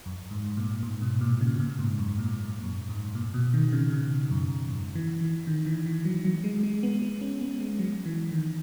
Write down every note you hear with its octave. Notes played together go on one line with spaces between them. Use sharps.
F#2
G#2
A#2
G#2
B2
A#2
C#3
B2
A#2
G#2
F#2
A#2
A#2
F#2
G#2
A#2
B2
D#3
C#3
B2
F#2
G#2
E3
E3
D#3
E3
E3
F#3
F#3
G#3
G#3
B3
B3
C#4
B3
G#3
F#3
E3
D#3